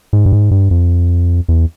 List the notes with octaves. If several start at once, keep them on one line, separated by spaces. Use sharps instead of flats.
G#2
G2
G#2
G2
F2
E2